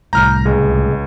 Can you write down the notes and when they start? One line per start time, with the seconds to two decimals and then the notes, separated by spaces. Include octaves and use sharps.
0.13 C2 A2 A#5 F6 G6
0.45 C#2 G#4 D#5